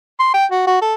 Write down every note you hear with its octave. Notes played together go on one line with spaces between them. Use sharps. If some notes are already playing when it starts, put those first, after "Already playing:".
C6
G5
F#4
F#4
A4